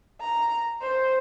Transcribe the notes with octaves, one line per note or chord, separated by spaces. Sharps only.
A#5
C5